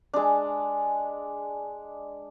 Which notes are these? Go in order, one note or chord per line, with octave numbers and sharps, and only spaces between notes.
G#3 D4